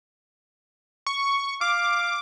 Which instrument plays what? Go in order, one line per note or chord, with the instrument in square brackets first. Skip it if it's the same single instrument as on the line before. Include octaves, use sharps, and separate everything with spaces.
[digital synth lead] C#6
[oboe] F5 [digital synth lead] D6